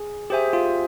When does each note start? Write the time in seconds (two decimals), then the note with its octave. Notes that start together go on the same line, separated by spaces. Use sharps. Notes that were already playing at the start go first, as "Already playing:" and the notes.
Already playing: G#4
0.30 G4 G#4 C5 E5 G#5
0.53 F4